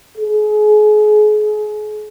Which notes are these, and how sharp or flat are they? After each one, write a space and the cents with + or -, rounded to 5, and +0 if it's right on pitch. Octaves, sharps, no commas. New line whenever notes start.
G#4 +35